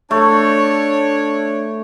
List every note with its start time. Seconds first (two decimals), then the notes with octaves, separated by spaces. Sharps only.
0.11 A3 D4 C#5